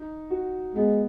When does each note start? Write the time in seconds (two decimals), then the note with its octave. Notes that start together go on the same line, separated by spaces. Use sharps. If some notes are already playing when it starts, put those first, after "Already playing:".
Already playing: D#4
0.30 F#4
0.75 G#3 B3